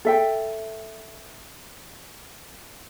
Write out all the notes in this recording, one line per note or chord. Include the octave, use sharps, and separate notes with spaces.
A4 E5 G5